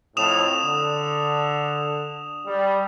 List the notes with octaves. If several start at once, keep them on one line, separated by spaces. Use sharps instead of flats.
F2 A2 D#6 E7 F7
D3
G3